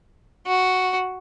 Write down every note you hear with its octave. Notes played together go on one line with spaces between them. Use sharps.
F#4